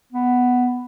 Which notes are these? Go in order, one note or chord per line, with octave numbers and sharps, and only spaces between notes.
B3